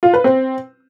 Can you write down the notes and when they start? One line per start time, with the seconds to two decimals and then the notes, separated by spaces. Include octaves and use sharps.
0.03 F4
0.14 B4
0.24 C4